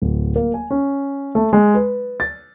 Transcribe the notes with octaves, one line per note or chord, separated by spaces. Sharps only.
D1
A#3
G#5
C#4
A3
G#3
B4
A6